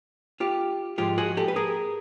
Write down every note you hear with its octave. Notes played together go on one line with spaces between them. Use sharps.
F4 G4
G#2 F3 G#3 F4 G4
F#4 G#4
G4 A4
B4
G#4 A#4